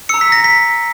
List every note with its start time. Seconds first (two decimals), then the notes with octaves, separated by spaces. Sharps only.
0.09 A#5 E6 C#7
0.21 B6
0.32 A#6
0.44 B6